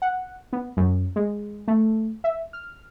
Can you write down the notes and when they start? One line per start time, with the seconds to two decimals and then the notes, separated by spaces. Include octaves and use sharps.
0.02 F#5
0.53 B3
0.77 F#2
1.16 G#3
1.68 A3
2.24 E5
2.53 F6